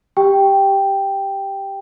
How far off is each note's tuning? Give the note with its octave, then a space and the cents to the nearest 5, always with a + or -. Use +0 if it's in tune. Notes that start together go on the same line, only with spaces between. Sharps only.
G4 +0 G5 +0